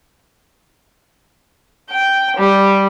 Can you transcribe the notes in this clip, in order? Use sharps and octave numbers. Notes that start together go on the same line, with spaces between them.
G5
G3